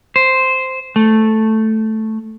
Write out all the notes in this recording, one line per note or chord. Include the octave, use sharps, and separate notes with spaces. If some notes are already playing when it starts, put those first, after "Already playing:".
C5
A3